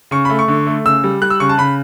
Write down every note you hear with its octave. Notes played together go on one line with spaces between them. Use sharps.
C#3 C#6
A3 B5
C#6
D3
A3
C#3 E6
G3
G3 F#6
E6
C#3 C#6
A5
C#3 B5